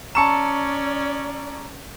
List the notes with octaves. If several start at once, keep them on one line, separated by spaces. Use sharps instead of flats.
C#4 D5 A5 A#5 C#6 E6 C#7 E7